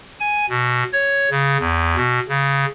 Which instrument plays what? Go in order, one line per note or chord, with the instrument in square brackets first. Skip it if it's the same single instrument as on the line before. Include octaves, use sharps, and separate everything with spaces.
[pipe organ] G#5
B2
C#5
C#3
E2
B2
C#3